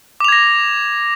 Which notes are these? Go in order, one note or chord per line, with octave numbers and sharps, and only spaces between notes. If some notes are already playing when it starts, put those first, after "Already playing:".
D6 G#6 A#6 F7